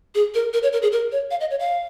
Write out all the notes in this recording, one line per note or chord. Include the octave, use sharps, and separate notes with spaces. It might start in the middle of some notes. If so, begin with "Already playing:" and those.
G#4
A#4
A#4
C#5
A#4
G#4
A#4
C#5
F5
D#5
C#5
F5